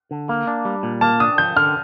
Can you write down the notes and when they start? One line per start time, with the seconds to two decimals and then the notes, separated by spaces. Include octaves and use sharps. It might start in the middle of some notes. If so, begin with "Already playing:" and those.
0.11 D3
0.29 A#3
0.47 D4
0.65 G3
0.83 A#2
1.01 A#3 A5
1.20 D4 D#6
1.38 F3 G6
1.56 D3 F6